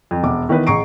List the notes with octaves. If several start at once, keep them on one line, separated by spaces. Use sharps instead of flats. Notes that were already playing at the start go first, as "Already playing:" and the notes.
F2
E1 F#5 D6
D#3 E3 B3 B4
A1 G#4 A#5 C#6 C7 D7